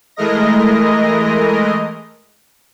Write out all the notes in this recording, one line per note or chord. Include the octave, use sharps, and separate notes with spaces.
E3 G#3 A3 A#4 D#5 A#6